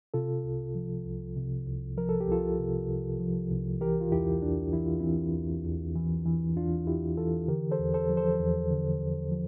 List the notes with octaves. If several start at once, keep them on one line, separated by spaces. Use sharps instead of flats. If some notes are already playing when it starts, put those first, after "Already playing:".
C3 F4 A4
C2
F3
C2
C3
C2
F3 A#4
A4
G4
C2 F4 A4
C3
C2
F3
C2
E3 G4 A#4
F4
E2 E4 G4
E2 D4
E3 E4
F4
E3 C4 E4
E2
E2
E3
E3
E2 D4 F4
E2 E4 G4
E3 F4 A4
D3 G4 A#4
A4 C5
E2
A4 C5
F3
A4 C5
E2
D3
E2
F3